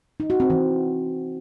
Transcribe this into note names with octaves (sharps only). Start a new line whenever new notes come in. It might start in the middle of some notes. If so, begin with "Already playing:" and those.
D#4
F#4
C4
E3